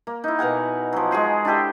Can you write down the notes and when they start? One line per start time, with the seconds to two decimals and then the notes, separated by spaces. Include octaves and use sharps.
0.07 A#3
0.24 D#4 E4
0.39 B2 A#4 F#5 G#5
0.93 F3 F#3
1.11 G#3 F#4 G#4 C5
1.45 D4 E4 G4 A4